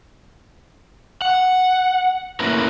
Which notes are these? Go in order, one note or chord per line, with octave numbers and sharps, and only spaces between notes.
F#5
A#3 C#4 E4 A#4 B4